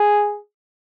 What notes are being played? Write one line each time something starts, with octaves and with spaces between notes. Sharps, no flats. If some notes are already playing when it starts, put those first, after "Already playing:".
Already playing: G#4